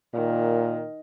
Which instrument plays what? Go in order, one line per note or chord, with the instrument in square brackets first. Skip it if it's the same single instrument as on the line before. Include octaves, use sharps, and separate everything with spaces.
[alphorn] A#2 [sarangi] D#3